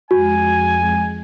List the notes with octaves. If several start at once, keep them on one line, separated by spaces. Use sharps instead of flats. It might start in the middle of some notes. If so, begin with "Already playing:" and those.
F2 G#3 F#4 G#5